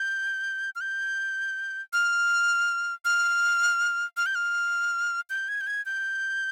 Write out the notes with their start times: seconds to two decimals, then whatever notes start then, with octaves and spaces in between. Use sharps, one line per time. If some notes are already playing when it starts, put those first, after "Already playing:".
Already playing: G6
0.75 F6
0.81 G6
1.93 F6
3.05 F6
4.17 F6
4.26 G6
4.35 F6
5.30 G6
5.49 G#6
5.61 G6
5.67 G#6
5.86 G6